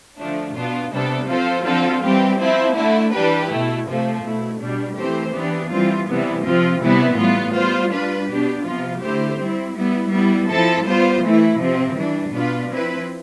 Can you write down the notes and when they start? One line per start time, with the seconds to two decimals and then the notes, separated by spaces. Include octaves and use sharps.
0.18 D3 F3 A3 D4
0.55 B2 B3 D4 F4
0.92 C3 G3 B3 D4 A4
1.29 F3 C4 F4 A4 C5
1.65 D3 F3 C4 F4 A4
2.03 E3 G3 C4 G4
2.39 F3 C4 E4
2.76 D3 A3 E4
3.13 E3 G3 D4 G4 B4
3.50 B2 A3 E4
3.86 C3 F3 A3
4.23 B2 A3 E4
4.60 B2 G3 D4
4.97 E3 A3 C4 G4 C5
5.34 E3 B3 D4 G4
5.71 E3 G3 C4 F4
6.08 C3 E3 G3 B3
6.44 C3 F3 C4 F4
6.81 C3 E3 G3 B3 E4
7.18 A2 G3 B3 F4
7.54 G3 B3 F4 C5
7.92 G3 D4 F4 B4
8.29 B2 B3 D4 G4
8.65 C3 F3 B3 F4
9.02 D3 A3 E4 G4 C5
9.39 G3 C4 E4
9.76 G3 B3 E4
10.12 G3 B3 E4
10.49 F3 C4 E4 A4
10.86 G3 B3 F4 C5
11.23 E3 A3 E4
11.60 C3 F3 C4
11.96 E3 G3 D4
12.33 B2 B3 D4 F4 B4
12.70 F3 C4 E4 B4